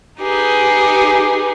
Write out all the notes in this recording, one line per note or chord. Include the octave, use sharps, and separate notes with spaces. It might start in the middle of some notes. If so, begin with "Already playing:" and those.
D#4 G4 G#4 B4